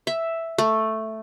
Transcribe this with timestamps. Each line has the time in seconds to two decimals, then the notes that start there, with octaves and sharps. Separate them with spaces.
0.07 E5
0.58 A3